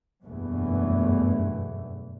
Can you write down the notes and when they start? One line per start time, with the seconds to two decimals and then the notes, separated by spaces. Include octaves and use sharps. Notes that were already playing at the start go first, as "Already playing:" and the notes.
0.23 F#1 E2 G2 B2 E3 A3